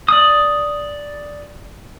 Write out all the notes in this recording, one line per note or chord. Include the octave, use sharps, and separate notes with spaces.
D5 D#6